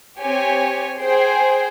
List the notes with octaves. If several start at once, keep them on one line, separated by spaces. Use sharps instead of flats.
C4 G4 C#5 G#5
G#4 C5 G5